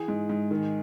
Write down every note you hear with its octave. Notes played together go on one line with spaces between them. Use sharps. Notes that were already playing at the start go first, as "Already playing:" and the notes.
Already playing: E3 G#4
G#2
G#2
D#3